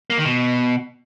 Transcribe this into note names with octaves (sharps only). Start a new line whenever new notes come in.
A#3
D#3
B2